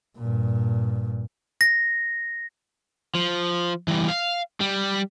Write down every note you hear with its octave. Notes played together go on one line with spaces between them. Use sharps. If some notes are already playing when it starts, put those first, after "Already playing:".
G2 A#2
A#6
F3
E3 G3
F5
G3